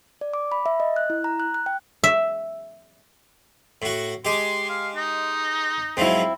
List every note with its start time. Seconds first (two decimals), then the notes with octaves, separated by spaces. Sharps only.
0.21 D5
0.34 D6
0.52 B5
0.66 E5
0.80 D#5
0.96 F#6
1.10 E4
1.24 A#5
1.40 F#6
1.54 F#6
1.66 G5
2.04 E5
3.82 A2 F#4
4.25 G#3 G4 C6
4.69 F5
4.96 D#4
5.97 G#2 F3 F#3 C4 E4